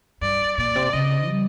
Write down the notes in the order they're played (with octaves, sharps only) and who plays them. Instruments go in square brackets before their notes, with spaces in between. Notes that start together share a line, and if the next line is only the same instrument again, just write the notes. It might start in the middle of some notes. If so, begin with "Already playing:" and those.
[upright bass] G2 [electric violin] D5
[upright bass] A#2 [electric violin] D5
[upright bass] C3
[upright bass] C#3 [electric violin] D#5
[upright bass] G3